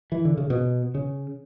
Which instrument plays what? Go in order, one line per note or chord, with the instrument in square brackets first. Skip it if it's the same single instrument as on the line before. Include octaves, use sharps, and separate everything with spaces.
[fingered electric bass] E3
D3
C#3
B2
C#3